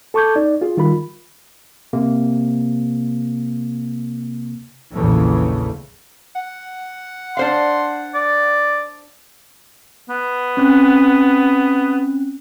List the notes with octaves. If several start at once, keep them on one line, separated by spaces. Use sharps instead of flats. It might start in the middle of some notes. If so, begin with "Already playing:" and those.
A4 A5 C#6 D6 G6 G#6
D#4 D5
F4 G#4
D#3 G3 F4 A#4 B5
C3 A#3
A#1 E2 C#3 E3 A3
F#5
D4 C5 F5 C6
D5
B3
C4 C#4 F#6